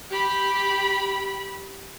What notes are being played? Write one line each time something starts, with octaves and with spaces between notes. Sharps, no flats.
G4 B5